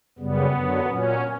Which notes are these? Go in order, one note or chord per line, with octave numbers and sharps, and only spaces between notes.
F#2 C#3 G3 B3
F#2 D3 F#3
A#2 F#3 C#4